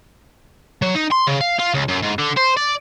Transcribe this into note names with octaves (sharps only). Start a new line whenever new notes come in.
F#3
D#4
C6
C#3
F5
F4
C#2
F#2
G#2
D3
C5
D5